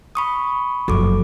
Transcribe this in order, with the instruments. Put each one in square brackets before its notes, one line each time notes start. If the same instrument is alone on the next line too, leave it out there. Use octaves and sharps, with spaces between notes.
[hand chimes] B5 C#6 D#6
[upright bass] F#1 F3 [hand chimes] F#4 A4 D6